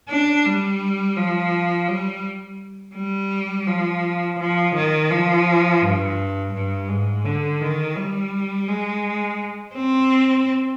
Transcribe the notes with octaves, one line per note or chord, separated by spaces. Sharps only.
D4
G3
F3
G3
G3
F3
F3
D#3
F3
G2
G2
G#2
D3
D#3
G3
G#3
C4